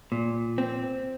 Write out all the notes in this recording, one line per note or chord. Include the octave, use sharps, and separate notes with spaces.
A#2
C4